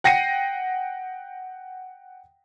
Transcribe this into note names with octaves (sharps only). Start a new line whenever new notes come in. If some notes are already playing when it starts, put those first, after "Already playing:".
F#5 G5 A#6 C7 C#7 D#7